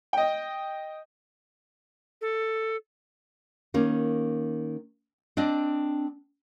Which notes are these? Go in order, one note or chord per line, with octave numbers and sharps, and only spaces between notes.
D#5 G5
A4
D#3 A#3 C#4
C4 D4 D5 D#5